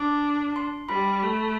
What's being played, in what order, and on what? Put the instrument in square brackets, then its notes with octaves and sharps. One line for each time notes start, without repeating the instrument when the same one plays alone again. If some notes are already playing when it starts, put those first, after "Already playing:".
Already playing: [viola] D4 [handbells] D6
[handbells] C6
[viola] G3 [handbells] B5
[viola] A3